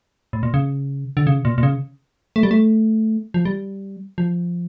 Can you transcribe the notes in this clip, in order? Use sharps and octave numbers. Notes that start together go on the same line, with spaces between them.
A2
A#2
C#3
D3
C#3
A#2
A#2
C#3
A3
G3
A3
F3
G3
F3